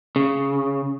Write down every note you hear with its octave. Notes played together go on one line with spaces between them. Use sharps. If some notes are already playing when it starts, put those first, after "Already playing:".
C#3